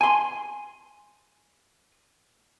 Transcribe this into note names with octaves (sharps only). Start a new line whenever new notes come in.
G#5 C6